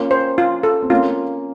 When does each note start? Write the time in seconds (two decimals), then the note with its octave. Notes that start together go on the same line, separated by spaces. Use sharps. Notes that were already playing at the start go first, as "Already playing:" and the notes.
Already playing: A#3 C#4 F4
0.11 C5
0.38 F4
0.63 A4
0.82 C4
0.90 A#3 C#4 F4